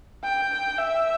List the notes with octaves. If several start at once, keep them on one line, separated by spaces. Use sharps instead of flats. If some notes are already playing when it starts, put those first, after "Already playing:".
G5
E5